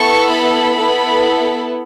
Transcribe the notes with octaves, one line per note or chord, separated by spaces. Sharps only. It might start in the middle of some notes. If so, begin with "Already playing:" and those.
Already playing: B3 E4 A4 C#6
B5
B3 E4 A4